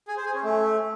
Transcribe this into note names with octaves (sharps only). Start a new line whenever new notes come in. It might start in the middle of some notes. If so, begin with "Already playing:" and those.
G#4
C5
G#4
C#4
A3